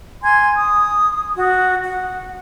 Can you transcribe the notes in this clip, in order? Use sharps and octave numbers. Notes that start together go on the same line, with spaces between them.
G#5 C6 G#6
D#6
F#4
F#5